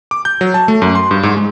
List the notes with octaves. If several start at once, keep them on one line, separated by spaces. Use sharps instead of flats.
D6
G6
F#3
A5
A3
F#2
C6
G2
G#2
G#3